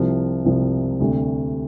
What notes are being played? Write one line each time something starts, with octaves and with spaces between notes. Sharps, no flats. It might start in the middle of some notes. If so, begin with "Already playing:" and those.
Already playing: C2 C3 F3
C2 C3 F3
D2 C3 G3